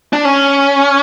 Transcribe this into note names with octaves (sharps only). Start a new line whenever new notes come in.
D4
C#4